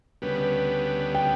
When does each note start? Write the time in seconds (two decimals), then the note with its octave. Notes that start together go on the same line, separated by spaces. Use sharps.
0.22 D2 C#3 G3 B3 B4
1.15 G5